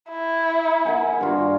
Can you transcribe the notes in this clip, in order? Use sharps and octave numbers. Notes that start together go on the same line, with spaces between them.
E4
A#4 F#5 G#5
G2 F4 F#4